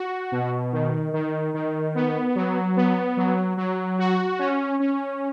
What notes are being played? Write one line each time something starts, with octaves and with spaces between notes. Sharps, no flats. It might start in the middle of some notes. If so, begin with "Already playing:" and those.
Already playing: F#4
B2
D#3
D#3
D#3
B3
F#3
B3
F#3
F#3
F#4
C#4
C#4